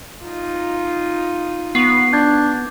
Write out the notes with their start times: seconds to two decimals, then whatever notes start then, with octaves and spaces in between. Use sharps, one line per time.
0.23 D#4 F4
1.75 B3 C#6 C7
2.13 D4 G6 G#6